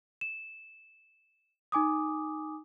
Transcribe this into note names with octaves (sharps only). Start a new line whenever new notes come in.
E7
D#4 G#5 D6 D#6